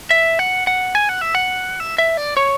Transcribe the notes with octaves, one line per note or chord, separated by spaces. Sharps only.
E5
F#5
F#5
G#5
F#5
E5
F#5
E5
E5
D5
C#5